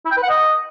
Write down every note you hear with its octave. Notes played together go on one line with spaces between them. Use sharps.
E4
G5
B4
F#5
D#5